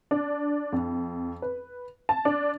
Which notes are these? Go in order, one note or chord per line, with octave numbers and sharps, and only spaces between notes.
D4
F2
B4
A5
D4